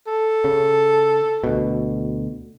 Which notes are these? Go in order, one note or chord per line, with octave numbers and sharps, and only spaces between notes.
A4
C#3
D2 B2